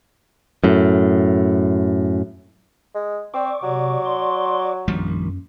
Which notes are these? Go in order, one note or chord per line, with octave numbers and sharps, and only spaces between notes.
F#2 A2
G#3
C4 D5 C#6 D6
C3 F#3
C6
A#1 F#2 D#3 F3 G3